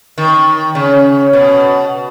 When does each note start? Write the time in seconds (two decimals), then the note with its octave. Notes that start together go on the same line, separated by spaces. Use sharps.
0.18 D#3
0.75 C#3
1.33 B2